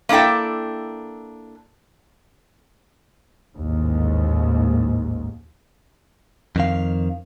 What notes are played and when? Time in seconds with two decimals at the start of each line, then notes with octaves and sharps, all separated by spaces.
0.09 A#3 D4 E4 A4 G5
3.57 A1 D#2 G#2
6.56 F2 D#3 F5